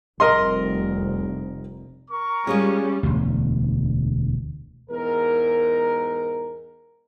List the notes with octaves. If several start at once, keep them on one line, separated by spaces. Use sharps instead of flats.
F1 C2 A#4 D#5 C6
A#4 A#5 C#6
G3 G#3 C#4 F4 G#4
E1 D2
E2 G#2 A#4